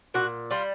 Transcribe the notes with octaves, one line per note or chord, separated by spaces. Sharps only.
A#2 F#4
G3 F4